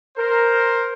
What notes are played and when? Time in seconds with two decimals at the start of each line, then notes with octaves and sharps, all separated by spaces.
0.16 A#4 C5